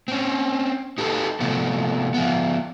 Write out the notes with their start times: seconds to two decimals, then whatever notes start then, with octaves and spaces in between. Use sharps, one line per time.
0.08 C4 C#4
0.98 D#4 G4 A4 B4
1.40 C3 F3 A3 B3
2.14 F3 B3